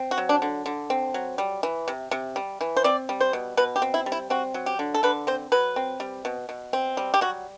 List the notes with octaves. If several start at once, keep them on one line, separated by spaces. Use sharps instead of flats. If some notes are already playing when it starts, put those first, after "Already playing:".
Already playing: C4
F#4
F#3
D4
D3
D3
C4
F#3
G3
E3
C3
C3
G3
E3
C5
C4 D5
G3
C5
B2
B2 B4
G4
C4
E4
G3
E4
C4 F#4
F#3
G4
D3
A4
D3 B4
C4 C5
F#3 B4
C4
G3
B2
B2
C4
G3
G4
F#3 F#4